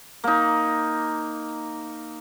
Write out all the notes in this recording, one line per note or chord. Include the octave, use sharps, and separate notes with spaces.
A#3 D#4